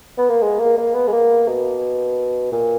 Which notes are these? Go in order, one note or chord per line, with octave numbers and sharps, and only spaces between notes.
B3
A#3
G#3
A#3
A#3
B3
G#3
A#3
B2
A#2